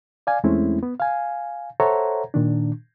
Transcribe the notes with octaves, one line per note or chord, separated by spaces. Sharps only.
D5 F5 G#5
E2 G#3 A3 C4 C#4 E4
B3
F5 G#5
A4 C5 C#5 E5 F#5 A#5
A#2 D#3 D4